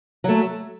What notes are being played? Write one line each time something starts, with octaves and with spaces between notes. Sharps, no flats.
F#3 A3